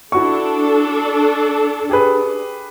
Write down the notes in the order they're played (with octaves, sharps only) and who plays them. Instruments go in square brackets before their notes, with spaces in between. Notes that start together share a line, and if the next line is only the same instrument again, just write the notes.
[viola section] D4 A4 [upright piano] E4 F#4 C#6
[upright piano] G4 G#4 B4